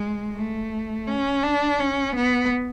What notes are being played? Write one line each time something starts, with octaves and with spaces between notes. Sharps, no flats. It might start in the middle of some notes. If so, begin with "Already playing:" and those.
Already playing: G#3
A3
C#4
D4
C#4
B3